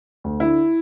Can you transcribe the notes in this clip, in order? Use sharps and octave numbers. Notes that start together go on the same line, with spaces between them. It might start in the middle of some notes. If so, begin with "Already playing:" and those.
D2
D3 E4